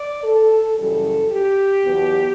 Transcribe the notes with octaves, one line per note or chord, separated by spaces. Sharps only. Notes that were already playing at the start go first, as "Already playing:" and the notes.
Already playing: D5
A4
F#2 C#3 E3 G3 C#4 A4
G4
E2 B2 F#3 B3